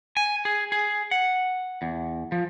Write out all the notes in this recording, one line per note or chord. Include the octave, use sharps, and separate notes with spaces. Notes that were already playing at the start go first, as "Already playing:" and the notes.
G#5
G#4
G#4
F#5
E2
F3